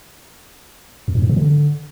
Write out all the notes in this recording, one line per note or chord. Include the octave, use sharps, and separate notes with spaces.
E2
G2
G#2
C3
D3